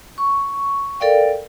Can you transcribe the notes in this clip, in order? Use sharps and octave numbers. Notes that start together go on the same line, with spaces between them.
C#6
A4 A#4 D5 F5 G5